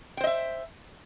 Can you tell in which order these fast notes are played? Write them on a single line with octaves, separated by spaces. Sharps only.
G5 C5 D#5 E5